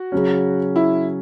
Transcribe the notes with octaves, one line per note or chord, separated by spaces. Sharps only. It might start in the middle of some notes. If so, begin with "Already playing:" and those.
Already playing: F#4
C#3 F#3 C#4
E4